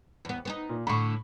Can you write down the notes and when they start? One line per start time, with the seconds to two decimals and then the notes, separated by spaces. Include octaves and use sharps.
0.25 E2 B3
0.45 B3 C4 D#4
0.69 A#2
0.87 A2 D3 B5 C#6